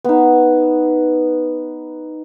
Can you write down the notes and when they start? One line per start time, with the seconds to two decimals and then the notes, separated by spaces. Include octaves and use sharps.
0.04 B3 D#4